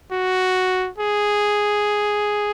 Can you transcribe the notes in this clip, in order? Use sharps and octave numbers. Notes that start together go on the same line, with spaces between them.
F#4
G#4